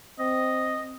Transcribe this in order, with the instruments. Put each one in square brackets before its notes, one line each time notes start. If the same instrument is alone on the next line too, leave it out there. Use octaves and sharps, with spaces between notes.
[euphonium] C4 [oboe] D#5